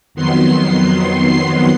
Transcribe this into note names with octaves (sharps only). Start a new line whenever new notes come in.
F2 D#3 F#3 B3 C6 C7